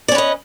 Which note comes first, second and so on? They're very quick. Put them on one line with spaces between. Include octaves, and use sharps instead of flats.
D5 C#4 B4 D#5